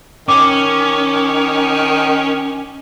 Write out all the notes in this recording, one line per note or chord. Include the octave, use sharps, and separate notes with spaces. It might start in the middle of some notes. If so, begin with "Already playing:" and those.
D#3 C#4 D6